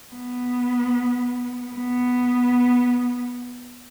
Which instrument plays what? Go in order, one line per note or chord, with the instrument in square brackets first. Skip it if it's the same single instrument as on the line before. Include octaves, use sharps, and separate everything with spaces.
[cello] B3
B3